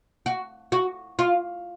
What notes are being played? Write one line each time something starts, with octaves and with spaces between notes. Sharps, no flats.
F#4
F#4
F4